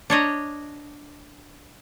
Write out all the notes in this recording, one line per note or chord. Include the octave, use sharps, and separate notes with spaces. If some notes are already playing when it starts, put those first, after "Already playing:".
D4 C#5 D#5 A#5